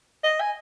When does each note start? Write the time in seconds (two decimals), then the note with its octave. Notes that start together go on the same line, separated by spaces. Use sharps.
0.24 D#5
0.41 G#5